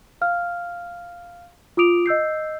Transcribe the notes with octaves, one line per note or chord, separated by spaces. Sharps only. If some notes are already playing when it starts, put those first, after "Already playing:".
F5 F6
F4 D6 D#6 D7 F7
D#5 E6 G6 C7